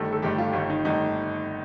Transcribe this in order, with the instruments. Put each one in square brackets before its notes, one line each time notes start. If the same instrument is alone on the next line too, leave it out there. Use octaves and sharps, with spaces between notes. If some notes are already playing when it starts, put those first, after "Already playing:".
Already playing: [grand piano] G1 G2 D#3 A3 [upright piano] A4
[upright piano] A4
[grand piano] G1 G2 D#3 A3 [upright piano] G4
[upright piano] F4
[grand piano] G1 G2 D#3 A3
[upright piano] D#4
[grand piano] G1 G2 D#3 A3 [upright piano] D#4